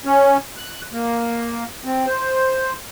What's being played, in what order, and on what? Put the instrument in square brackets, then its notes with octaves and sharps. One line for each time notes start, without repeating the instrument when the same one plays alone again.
[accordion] C#4
F#6
A#3
C4
C5